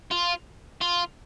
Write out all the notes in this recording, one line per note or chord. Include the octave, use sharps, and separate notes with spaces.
F4
F4